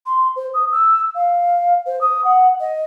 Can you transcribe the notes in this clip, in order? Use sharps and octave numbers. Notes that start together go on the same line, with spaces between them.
C6
C5
D#6
E6
F5
C5
D#6
F#5
D#5